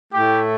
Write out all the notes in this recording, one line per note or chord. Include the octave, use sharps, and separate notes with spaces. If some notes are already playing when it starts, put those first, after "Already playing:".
A2 A3 E4 G4